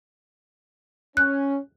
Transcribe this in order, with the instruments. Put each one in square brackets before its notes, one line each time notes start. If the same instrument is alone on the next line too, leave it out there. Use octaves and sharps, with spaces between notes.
[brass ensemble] C#4 [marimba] F#6